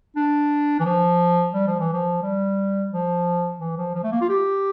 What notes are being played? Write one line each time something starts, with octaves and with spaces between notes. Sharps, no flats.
D4
E3
F3
G3
F3
E3
F3
G3
F3
E3
F3
F3
A3
A#3
F4
G4